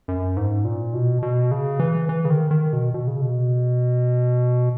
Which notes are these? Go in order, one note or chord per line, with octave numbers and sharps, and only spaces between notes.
F#2
G#2
A#2
B2
B2
C#3
E3
E3
C#3
D#3
D#3
B2
B2
C#3
B2